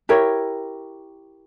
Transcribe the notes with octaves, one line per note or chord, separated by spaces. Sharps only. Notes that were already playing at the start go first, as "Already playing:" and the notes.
E4 G4 A#4 C#5